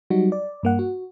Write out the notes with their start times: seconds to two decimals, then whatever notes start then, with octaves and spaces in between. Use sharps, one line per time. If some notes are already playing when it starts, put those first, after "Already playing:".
0.10 F#3 G3 D#4 F#4
0.32 D5
0.63 G2 A#3 F#5
0.79 F#4